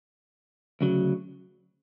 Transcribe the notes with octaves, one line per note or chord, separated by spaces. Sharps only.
D2 C#3 F#3